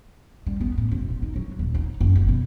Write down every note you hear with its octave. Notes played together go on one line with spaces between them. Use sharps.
G3
B3
A2
E1
F3
D#4
F#3
D#1
D#4
F#1
F2
B2